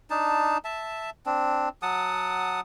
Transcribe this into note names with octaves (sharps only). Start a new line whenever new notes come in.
D4 D#4 A5
E5 A5
C4 D4
F#3 F#5 A5 D#6